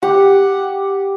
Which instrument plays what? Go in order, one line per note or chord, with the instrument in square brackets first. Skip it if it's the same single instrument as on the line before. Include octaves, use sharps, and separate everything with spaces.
[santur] G4 [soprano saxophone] F#5